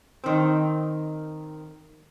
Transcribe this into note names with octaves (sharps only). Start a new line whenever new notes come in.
D#3 C4